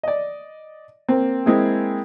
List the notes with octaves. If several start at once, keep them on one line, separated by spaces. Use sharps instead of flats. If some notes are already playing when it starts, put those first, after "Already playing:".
D5 D#5
A#3 C4
G#3 A#3 C4 E4 G#4